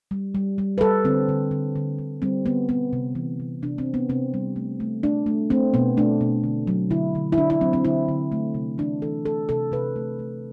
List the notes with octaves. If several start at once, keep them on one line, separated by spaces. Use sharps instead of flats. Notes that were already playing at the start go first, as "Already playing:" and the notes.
G3
G3
G3
B4
G3 A4
D3 C4
D3
D3
D3
D3
G3 C4
D3 B3
G3 B3
C3
E3
C3
C3 D4
C4
E3
B3
C3 C4
G3
A3
A3
A3 D4
A3
A3 C4
B2 B3
A3 D4
B2
D3
F#3
D3 E4
D3
E4
D3 D4
E4
F#3 C4
C4
D3 E4
D3
A3
C3
E3 D4
E3 A4
A3 A4
C3 A4
C3 B4
A3
A3